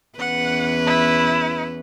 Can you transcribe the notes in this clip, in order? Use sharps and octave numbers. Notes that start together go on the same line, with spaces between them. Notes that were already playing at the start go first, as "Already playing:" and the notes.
E2 C#4 B4 F#5
E4